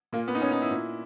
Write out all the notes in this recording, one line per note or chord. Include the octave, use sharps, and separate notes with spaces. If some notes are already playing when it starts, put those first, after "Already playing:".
A#2 A#3
B3
D#4
C#4
D#4
E4
A#2